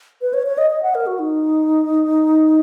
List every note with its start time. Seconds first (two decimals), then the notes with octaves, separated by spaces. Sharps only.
0.21 B4
0.33 C#5
0.46 C#5
0.58 D#5
0.70 D#5
0.82 F#5
0.95 A#4
1.06 F#4
1.19 D#4